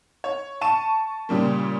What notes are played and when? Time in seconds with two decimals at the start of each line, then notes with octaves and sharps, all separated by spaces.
0.24 C#5
0.61 A5 C#6 D#7 E7
1.29 A#2 C#3 G3 A#3